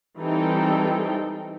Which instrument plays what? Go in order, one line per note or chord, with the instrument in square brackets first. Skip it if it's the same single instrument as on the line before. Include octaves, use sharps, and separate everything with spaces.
[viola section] E3 G3 C4 D#4 A4 G5